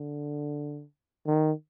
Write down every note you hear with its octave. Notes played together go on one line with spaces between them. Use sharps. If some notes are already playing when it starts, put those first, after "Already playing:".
Already playing: D3
D#3